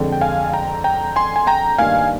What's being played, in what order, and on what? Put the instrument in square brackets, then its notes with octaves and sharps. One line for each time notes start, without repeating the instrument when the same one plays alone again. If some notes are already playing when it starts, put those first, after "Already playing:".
Already playing: [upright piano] F2 D3 G#3
[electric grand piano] G5
F5 G#5
G5 A#5
G5 A#5
G#5 C6
G#5
G5 A#5
[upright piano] G2 D#3 A#3 [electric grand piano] F5 G#5